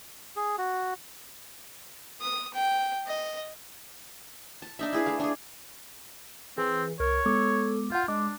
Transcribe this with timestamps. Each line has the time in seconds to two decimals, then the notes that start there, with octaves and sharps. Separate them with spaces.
0.36 G#4
0.58 F#4
2.21 D#6
2.54 G5
3.07 D#5
4.62 A5
4.79 D4 D#4 E5
4.93 E4 G#4 B4
5.06 A3 F5
5.20 D4 G#4
6.58 E3 C4 G#4
7.00 C2 A#4 C#5
7.26 G#3 B3 A4 D6
7.92 F4 F5 F#5 G6
8.08 G#3 D4 D6